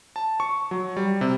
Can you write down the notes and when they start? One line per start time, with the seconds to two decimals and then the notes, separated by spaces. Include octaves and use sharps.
0.16 A5
0.40 C#6
0.71 F#3
0.97 G3
1.21 C3